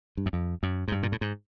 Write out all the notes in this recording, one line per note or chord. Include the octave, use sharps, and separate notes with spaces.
G2
F#2
F2
F#2
G#2
G2
A#2
A2
G#2